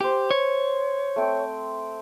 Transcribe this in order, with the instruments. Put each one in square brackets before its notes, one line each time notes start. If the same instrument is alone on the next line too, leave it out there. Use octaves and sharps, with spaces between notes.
[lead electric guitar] G4 [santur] C5 G#5
[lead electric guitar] C#5
[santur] A3 C4 G5